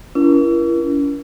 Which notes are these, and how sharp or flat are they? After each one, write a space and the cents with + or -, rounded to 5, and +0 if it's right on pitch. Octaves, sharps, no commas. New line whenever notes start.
C#4 +45 E4 +40 A#4 +35